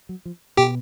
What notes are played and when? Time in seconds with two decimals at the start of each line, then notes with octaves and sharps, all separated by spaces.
0.09 F#3
0.25 F3
0.57 B2 G4 G5